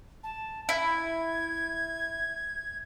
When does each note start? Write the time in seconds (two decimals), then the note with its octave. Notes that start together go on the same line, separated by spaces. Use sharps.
0.23 A5
0.69 E4 G#6